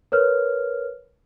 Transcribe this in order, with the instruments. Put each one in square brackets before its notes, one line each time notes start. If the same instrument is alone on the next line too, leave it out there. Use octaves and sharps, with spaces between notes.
[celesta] A#4 B4 C#5 F6